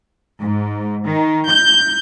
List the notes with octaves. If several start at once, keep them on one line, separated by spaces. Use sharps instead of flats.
G#2
D#3
G6